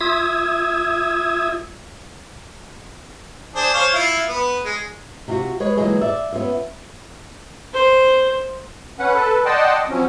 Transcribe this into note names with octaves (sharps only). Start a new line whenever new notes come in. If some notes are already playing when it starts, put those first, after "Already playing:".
F4 E5 D#6 E6 G#6
D4 G#4 C5
C5 C#5 F5
E4 F4
B3
G#3
C3 F4 F#4
G#3 B4 C#5
D2 A#2 E3 F#3 G#3 G#4
D5 E5
B3 C#4 F4 E5
C5
C#4 B4 F#5
A4 B4
D5 D#5 F#5 G5 A5 C6
F3 F#3 C4 C#4